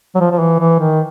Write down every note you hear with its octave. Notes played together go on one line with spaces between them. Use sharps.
F#3
F3
F3
E3
E3
D#3